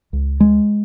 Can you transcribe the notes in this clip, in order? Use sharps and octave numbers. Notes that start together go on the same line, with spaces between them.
C#2
G#3